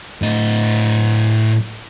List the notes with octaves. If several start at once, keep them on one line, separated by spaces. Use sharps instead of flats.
A2 D#5